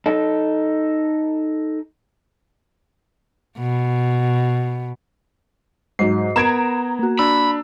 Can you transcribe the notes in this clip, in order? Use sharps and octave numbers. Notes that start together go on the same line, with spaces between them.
D#4 A4
B2
G#2 F#3 C7
B3 A#4 A#5 B5 G#6 D7 E7
A#3 F#4
D4 B5 E6